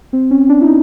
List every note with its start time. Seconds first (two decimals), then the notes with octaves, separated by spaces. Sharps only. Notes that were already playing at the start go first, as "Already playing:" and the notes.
0.13 C4
0.31 C#4
0.49 D4
0.61 E4
0.67 D#4